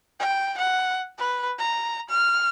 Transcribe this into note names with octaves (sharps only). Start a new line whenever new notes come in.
G5
F#5
B4
A#5
F6